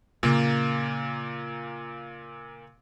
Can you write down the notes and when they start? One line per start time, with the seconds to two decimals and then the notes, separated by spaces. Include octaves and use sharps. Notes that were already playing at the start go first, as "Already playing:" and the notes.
0.23 A#2 C#3 A#3 C#4